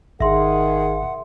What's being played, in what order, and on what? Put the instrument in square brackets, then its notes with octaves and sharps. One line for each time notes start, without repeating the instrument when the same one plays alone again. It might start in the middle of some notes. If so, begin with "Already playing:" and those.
[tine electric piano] G#1 [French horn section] D#3 G#4 [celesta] E5 C6 [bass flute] F#5